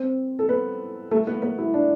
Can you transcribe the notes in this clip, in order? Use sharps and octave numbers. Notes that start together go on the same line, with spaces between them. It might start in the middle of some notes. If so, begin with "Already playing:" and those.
Already playing: C4 C5
A4
B3 B4
A3 A4
B3 B4
B3 B4
E4
D4